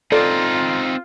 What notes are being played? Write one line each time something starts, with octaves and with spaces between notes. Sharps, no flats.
C4 D#4 F4 A4 D5